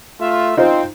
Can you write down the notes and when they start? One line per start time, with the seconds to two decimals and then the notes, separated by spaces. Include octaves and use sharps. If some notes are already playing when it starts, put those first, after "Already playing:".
0.20 A3 F4 E5
0.57 C4 D#4 F4 C5